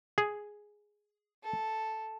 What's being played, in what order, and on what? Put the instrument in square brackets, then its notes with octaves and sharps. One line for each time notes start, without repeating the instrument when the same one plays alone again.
[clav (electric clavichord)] G#4
[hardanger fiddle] A4